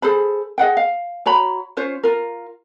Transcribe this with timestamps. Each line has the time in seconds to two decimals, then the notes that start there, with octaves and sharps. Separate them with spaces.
0.02 G#4 A4 C5 B5
0.58 G#4 D#5 F#5 G5
0.77 F5
1.26 F#4 C#5 A#5 B5
1.77 C#4 F4 C5 C#5
2.03 F4 A#4